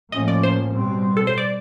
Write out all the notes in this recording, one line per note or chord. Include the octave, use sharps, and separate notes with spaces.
A2 F3 A#3 C#4 D#5
D5
C5
B2 G3 C4
A4
C5
D5